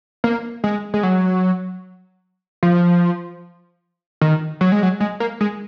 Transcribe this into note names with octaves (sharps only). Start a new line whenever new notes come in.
A#3
G#3
G#3
F#3
F3
D#3
F#3
G#3
F#3
G#3
A#3
G#3